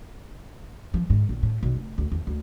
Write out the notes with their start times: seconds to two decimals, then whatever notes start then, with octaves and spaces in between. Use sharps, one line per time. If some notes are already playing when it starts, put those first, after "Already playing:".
0.94 F3
1.10 G#2
1.29 A#1
1.43 A2
1.63 B1
1.75 F1
1.98 D2
2.12 E2
2.27 D2